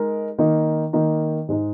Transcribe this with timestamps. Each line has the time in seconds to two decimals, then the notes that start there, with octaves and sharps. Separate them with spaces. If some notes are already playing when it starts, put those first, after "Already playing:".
Already playing: G#3 D#4 A#4
0.39 D#3 A#3 D#4
0.93 D#3 A#3 D#4
1.49 G#2 G#3 D#4